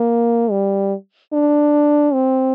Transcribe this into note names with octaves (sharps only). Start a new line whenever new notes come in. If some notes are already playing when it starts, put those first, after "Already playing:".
Already playing: A#3
G3
D4
C4